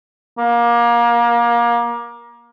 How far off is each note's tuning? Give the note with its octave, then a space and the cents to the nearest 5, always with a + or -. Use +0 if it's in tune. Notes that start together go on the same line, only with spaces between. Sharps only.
A#3 +25